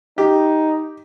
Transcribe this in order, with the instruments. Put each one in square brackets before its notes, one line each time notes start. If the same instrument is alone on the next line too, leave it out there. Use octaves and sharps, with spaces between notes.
[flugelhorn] D#4 [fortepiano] G4